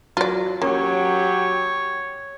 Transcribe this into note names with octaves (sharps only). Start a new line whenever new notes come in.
F#3 F4 D5
F#3 A#3 C#4 G4 C#5